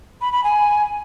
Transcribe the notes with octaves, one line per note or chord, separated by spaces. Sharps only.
B5
B5
G#5